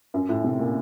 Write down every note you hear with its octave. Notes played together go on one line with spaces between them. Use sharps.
F#2
A2
C3
A#2